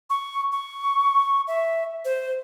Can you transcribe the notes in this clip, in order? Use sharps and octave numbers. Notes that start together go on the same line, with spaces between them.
C#6
C#6
E5
C5